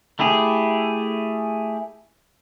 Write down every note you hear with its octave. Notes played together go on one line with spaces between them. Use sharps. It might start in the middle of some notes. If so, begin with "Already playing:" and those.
A3 E4 G4 G#4